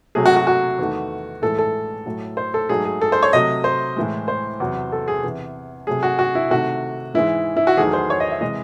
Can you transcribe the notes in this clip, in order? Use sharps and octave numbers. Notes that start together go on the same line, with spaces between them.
C3 F#3 A3 G#4
F#4
F#4
F#4
E2 D#3 A3
A2 E3 G#3 A4
A4
A2 F#3 A3
C5
A4
G#2 F#3 A3 G#4
G#4
A4
C5
C#5
C3 F#3 A3 D#5
C5
A2 E3 G#3
C5
E2 C3 F#3
A4
G#4
E2 C3 E3
C3 F#3 A3 G#4
F#4
F#4
E4
C3 D#3 A3 F#4
G#2 E3 G#3 E4
E4
F#4
E2 D#3 F#3 A3 G#4
C5
C#5
D#5
E5
C3 E3 G#3 D#5